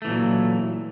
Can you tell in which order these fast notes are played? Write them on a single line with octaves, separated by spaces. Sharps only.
A3 E3 A#2 F#3